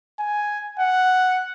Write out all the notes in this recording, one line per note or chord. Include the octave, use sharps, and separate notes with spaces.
G#5
F#5